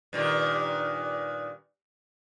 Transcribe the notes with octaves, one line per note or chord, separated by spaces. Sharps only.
G2 A#2 D#3